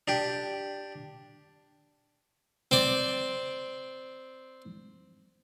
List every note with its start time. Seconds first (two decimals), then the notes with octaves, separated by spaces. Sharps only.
0.08 D4 G4
2.71 C4 D5